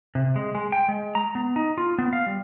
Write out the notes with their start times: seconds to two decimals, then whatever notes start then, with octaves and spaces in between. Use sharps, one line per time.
0.15 C3
0.36 G#3
0.55 G#3
0.72 G5
0.89 G#3
1.15 A#5
1.35 B3
1.56 D#4
1.78 F4
1.99 B3
2.13 F5
2.26 G3